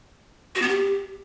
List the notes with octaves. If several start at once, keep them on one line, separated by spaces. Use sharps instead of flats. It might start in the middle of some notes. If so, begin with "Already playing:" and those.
F#4
B3
G4